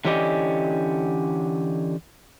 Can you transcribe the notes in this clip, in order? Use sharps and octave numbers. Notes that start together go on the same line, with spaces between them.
D3 E3 C#4 G4 D5 D#5